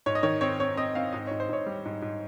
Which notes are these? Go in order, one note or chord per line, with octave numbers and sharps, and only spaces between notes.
G#2 C#5
D#5
D#3 C#5
C4 C#5
C4 C#5
C4 D#5
C4 F5
G#2 D#5
G#2 C#5
C5
G#2 C#5
G3
G#2
G#2